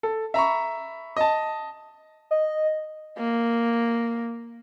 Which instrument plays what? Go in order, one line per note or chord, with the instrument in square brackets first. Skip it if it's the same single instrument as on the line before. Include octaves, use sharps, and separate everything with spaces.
[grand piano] A4
E5 A#5 B5 C#6
D#5 A5
[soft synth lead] D#5
[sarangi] A#3